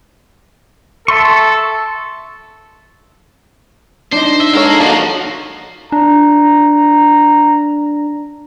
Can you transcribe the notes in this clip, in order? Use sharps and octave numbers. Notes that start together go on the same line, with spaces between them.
A4 E5 C6 C#6
D4 D#4 C5
E5
G#3 A4 A#4 C#5 F5
F3 A#3 D#4 F#4 A4
D4 A#5